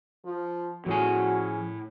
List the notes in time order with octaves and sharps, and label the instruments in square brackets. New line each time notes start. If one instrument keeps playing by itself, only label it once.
[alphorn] F3
[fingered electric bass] A2 [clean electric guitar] F3 G#4 G#5 [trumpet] C#4 [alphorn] F#4